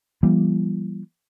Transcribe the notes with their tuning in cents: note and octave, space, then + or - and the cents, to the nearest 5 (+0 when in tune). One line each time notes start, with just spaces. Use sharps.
E3 +40 G3 +0 B3 -45